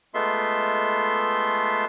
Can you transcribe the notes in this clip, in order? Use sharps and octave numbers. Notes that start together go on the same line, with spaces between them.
G#3 A3 B3 F4 E5 C6